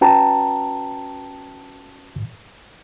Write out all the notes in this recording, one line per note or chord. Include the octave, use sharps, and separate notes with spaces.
C#4 F#4 B4 G5 A5 A#5